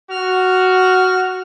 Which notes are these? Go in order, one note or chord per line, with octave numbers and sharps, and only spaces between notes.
F#4 F6